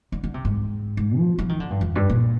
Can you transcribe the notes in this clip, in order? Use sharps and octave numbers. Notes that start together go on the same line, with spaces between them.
D3
D3
C3
G#2
G#2
F3
F3
D#3
D3
G2
F2
G2
A#2